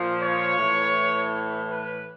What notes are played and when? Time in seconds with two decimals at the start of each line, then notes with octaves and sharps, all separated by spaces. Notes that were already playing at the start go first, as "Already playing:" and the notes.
Already playing: A#2 F3
0.20 C#5
0.57 A2 E3
1.69 B4